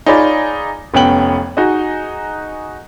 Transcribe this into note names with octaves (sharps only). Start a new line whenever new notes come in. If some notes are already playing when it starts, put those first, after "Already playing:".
D#4 F4 G#4 C#5 D5 B5
F1 B3 C#4 G5 F#7
D#4 F#4 G#4 D#5